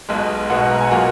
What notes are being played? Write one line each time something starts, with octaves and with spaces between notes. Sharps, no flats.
B1 B2 G#3
B1 B2 G#3 F#5
A#5
G#5
A#2 F#3 A#3 F#5